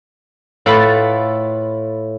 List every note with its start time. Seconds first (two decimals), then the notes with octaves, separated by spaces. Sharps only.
0.66 A2 F4 A4 B4 B5